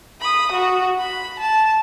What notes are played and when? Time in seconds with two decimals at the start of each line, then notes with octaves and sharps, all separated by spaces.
0.21 B5 D#6
0.52 F#4
0.99 B5
1.39 A5